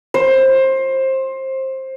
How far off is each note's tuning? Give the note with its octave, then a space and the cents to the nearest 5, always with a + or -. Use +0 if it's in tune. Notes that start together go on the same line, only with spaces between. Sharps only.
C5 +20